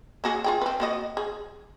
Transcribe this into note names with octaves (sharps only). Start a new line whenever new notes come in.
A#3 F#4 G#4
F4 G#4 G5
C4 B4
A#3 F#4 D#5
G#4